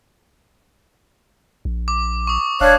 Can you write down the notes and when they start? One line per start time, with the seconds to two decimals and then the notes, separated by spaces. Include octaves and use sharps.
1.65 A#1
1.88 D6
2.27 C#6 D#6
2.61 D#1 D4 C#5 F5 F#6